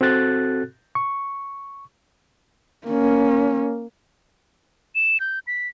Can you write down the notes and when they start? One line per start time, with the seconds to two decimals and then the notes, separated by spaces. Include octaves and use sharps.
0.01 C4 F#4 A4 F#6 A6
0.95 C#6
2.88 A#3 C#4
4.95 E7
5.20 G6
5.47 B6